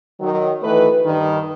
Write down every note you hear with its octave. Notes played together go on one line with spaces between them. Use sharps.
D#3 F#3
D#3 E3 A3 B4
G2 D#3